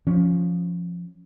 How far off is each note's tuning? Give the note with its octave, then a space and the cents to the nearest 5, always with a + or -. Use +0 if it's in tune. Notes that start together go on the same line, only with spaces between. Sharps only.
F3 +0 C#4 +0